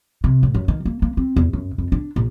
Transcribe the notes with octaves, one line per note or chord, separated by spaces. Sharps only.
C3
A2
F#2
D#3
A#3
A#3
C4
E2
F#2
F2
D4
A#1